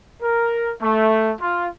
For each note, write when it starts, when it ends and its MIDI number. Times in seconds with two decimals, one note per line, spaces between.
0.22 0.72 70
0.82 1.32 57
1.41 1.68 65